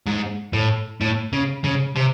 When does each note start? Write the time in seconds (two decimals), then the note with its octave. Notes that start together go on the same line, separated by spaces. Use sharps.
0.06 G#2
0.53 A2
1.01 A2
1.33 C#3
1.64 C#3
1.96 C3